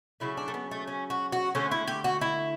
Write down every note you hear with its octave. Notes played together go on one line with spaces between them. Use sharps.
C#3 F#3 A3 E4
D4
A3
B3
A3
C#4
F#4
F#4
D3 A3 C#4
E4
G4
F#4
E4